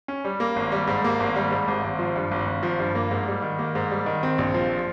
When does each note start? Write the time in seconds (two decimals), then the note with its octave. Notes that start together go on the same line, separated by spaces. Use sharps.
0.08 C#4
0.25 G3
0.40 A#3
0.56 G#1
0.72 G3
0.87 G#2
1.04 A#3
1.20 G#1
1.36 G3
1.51 G#2
1.68 G#1
1.84 G#1
1.99 F3
2.16 G2
2.31 G#1
2.47 G#1
2.63 F3
2.79 G2
2.95 A#3
3.11 G#2
3.28 G3
3.42 D#3
3.59 A#3
3.75 G#2
3.91 G3
4.06 D#3
4.23 C4
4.38 A#1
4.54 F3